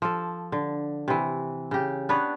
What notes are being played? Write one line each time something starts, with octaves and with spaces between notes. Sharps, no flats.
F3 A4
D3
C3 E3
C#3 G4
B3 D4 B4 C#5